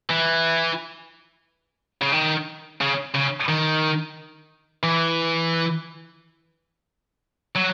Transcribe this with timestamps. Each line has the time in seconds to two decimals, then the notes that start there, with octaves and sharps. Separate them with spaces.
0.10 E3
2.02 C#3
2.13 D#3
2.81 C#3
3.14 C#3
3.48 D#3
4.83 E3
7.55 F#3